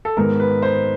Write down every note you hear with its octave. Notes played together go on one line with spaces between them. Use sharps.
A4
G#2 D#3 G#3 B3 A#4
B4
C5